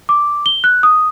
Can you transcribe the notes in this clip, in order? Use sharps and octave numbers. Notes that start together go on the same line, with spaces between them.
D6
G7
F#6
D#6